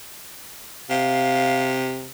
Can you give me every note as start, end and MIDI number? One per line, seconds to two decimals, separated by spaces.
0.90 2.09 48
0.90 1.80 77